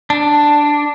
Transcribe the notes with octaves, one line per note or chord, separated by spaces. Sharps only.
D4